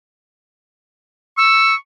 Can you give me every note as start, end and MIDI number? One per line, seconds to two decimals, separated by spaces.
1.37 1.75 85
1.37 1.75 88